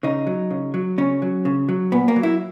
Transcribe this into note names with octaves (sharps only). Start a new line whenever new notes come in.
C#3 D#4
F#3
C#3
F#3
C#3 C#4
F#3
C#3
F#3
A#2 B3
A#3
F#3
E4